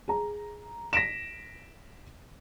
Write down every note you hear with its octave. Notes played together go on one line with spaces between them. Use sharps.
G#4 A#5
A#6 B6 D7 E7